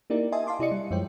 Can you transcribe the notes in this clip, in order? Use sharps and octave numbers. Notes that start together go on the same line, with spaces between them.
A#3 D#4 E4 G4 A#4 D5
D#5 E5 G#5 A5 C6 D#6
F5 A5 C6 D6
C3 E4 G4 D5 D#5 C#7
G3
F#2 F3 G#3 C5 C#5 G5